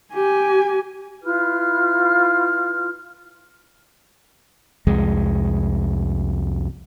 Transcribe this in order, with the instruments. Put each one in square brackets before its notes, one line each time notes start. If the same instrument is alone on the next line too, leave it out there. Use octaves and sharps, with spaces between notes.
[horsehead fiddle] G4 G#5
[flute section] E4 F4 B4 F6
[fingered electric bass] C2 F2 G#3